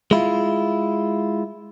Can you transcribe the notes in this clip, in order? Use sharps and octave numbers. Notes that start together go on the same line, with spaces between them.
G#3 E4 F4